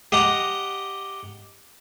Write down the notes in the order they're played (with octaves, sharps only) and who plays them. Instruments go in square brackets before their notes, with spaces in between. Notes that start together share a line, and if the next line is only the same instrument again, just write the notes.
[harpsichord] G4 D#5 F#5 A#5